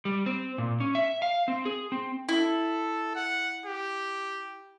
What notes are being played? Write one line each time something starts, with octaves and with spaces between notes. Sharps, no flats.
G3
C4
A#2
C#4
E5
F5
C4
G#4
C4
E4 A4
F#5
G4